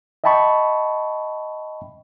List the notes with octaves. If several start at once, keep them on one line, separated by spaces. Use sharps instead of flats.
D#5 E5 G5 A5 B5 C#6